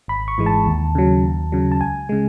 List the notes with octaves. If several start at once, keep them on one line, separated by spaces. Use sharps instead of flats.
G#1 B5
C#6
G#2 E3 G#3
A5
D#2
C#3 F#3
D#2
C#3 F#3
A5
C#2 G#5
C#3 G#3